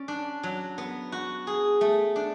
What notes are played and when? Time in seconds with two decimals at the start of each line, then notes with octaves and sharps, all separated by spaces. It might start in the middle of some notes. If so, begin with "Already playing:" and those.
Already playing: C#4 D5
0.08 D4
0.43 F#3
0.78 B3
1.12 F#4
1.47 G#4
1.81 A3
2.16 D4